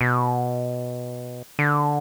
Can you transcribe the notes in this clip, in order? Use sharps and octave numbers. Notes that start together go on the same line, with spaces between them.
B2
D3